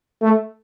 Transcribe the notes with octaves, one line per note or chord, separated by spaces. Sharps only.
A3